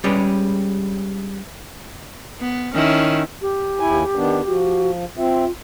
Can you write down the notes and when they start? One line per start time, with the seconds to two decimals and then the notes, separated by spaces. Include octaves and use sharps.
0.04 G3 G#3 C#4 G4 G#4 B4
2.40 B3
2.74 D#3 C#4 E4
3.42 G4
3.80 D#2 E4 G#5
4.15 D#3 B3 D4
4.47 F3 F#4
5.17 C4 F4 E5